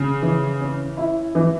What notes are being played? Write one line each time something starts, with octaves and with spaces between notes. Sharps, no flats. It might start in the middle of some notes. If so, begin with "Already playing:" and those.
Already playing: C#3
E3
C#4
E4
E3